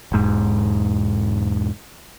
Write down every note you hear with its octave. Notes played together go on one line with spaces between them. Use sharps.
E1 G#2